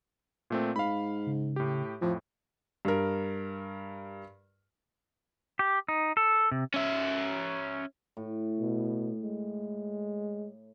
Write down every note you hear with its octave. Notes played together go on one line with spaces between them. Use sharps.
A#2 A3 C4
G#2 F5 B5
C#3
A2 G4
F2 A2 F3
G2 A#4
G4
D#4
A4
C3
C#4 E5
A2
B2
G#3